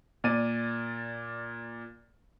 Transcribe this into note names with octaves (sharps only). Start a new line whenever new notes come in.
A#2 D5 D#7